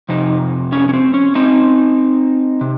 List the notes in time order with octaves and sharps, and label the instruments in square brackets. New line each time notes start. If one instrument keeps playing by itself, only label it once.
[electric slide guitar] F2 C3 D#4
C#4
C#4
C4
C#4
C4 D#4
C3